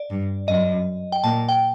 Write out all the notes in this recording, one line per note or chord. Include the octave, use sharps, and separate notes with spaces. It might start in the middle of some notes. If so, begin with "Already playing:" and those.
Already playing: D5
G2
F#2 D#5
G5
A#2 A5
G5